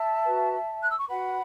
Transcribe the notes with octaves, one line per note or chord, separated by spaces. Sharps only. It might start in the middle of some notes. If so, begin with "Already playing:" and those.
Already playing: E5 A5
F#4 B4
F#6
E6
C#6
F#4 B4 F#5 B5